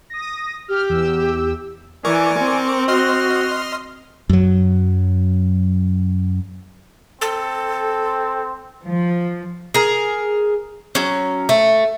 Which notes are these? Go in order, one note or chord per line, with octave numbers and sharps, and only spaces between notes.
D#6 A#6
G4 F6
E2 E6
E3 A#4 D5 G#5 C#6 D6
C4
F#4 D#5 C6 F6
F#2 F#3
C4 A4
F3
G#4 A#4
F#3 C#4
A3